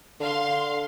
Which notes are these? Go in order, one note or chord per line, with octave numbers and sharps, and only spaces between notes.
D3 F5 C6